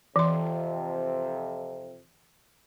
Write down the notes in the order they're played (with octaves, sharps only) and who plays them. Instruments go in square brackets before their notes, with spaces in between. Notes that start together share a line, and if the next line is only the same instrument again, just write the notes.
[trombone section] F2 C3 [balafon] E3 C6